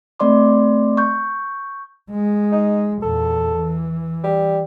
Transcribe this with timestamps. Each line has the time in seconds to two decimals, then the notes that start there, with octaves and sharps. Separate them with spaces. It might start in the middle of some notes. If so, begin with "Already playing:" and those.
0.20 A3 C4 D5 C6 D6
0.97 C#6 G6
2.11 G#3
2.52 D#4
3.02 E2 A#2 A4
3.56 E3
4.24 G3